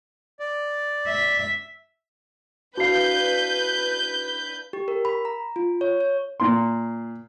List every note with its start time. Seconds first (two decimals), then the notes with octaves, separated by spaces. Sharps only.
0.40 D5
1.08 E5
2.77 D4 E4 F#4 B4 F5 G6 C7
4.73 G4
4.88 A#4
5.05 B5
5.25 A#5
5.56 F4
5.81 C#5
6.00 C#5
6.40 A#2 C6